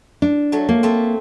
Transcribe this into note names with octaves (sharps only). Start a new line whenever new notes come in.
D4
F#3 A3
A#3
A3 C4